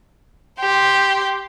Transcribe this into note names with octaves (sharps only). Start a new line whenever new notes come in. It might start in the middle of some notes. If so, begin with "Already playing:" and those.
G4 C6